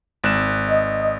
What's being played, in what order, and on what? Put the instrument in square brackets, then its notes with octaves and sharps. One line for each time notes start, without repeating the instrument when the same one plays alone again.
[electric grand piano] G#1 F#6 E7
[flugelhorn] D#5